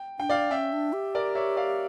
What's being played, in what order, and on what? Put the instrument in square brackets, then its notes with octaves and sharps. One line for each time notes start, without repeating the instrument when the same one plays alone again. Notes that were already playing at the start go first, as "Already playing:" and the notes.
Already playing: [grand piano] G5
[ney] D4 [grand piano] G5
[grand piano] D5 F5
[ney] C#4 [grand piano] E5 G5
[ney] D4
G4
[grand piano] A#4 D5
C#5 E5
D5 F5